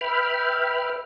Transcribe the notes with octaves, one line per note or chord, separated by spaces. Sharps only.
B4 E5 G5 B5 F6